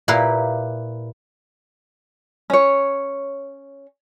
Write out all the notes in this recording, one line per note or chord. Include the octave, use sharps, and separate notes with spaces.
A#2 E4 G4 A#4 B4 F5
C#4 C#5